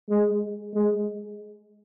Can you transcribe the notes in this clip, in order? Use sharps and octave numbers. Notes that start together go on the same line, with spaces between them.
G#3
G#3